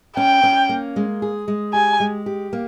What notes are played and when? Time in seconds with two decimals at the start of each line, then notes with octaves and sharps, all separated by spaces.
0.17 C#4 G5
0.43 C#4
0.69 A#3
0.96 G#3
1.22 G#4
1.48 G#3
1.74 G4 G#5
2.00 G#3
2.26 G4
2.53 A#3